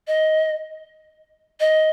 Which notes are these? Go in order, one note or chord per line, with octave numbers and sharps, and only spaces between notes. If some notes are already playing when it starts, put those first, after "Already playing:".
D#5
D#5